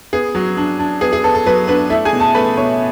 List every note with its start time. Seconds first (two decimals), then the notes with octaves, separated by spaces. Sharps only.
0.13 B3 G#4
0.35 F#3
0.57 D4
0.79 D4
1.01 B3 G#4
1.13 G#4
1.24 B3 A4
1.35 A4
1.46 F#3 B3 B4
1.68 B3 D4 B4
1.90 A3 E4 E5
2.05 G#4 G#5
2.13 B2
2.20 A4 A5
2.35 A3 B4 B5
2.57 B2 C#5 C#6